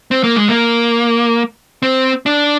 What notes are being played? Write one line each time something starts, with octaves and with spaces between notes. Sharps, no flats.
C4
A#3
G#3
A#3
C4
D4